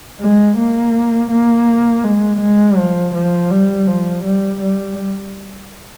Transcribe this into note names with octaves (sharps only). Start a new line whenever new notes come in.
G#3
A#3
A#3
G#3
G#3
F3
F3
G3
F3
G3
G3